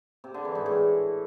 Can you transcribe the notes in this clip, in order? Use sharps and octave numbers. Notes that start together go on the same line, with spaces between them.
C3
D3
E3
G#2
A2